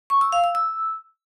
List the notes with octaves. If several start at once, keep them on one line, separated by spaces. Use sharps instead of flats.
C#6
E6
F5
E6
E6